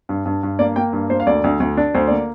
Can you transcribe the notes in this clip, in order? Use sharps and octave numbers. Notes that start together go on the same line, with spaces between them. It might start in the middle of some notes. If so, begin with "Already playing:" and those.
G2
G2
G2
A#3 D5
A#3 G5
G2
A#3 C5
F5
D2 D5
D2
D2
D4
D2 C5
A#3 D5